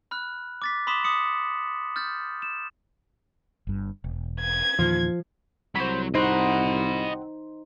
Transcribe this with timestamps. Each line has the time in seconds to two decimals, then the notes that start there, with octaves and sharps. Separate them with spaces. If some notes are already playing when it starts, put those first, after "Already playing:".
0.11 B5 F6 F#6
0.62 D6 A6 B6
0.87 B5 C6 D6 D#6 B6 E7
1.04 D6 D#6 C#7 F#7
1.96 F6 G6 A6
2.42 E7
3.67 G1 G2
4.04 E1
4.40 G#6
4.79 E2 A#2 D#3 F3
5.75 C2 F#3 F#4 C5 B5
6.15 C4 D#4 F#4 C5 D#5 F#5 B5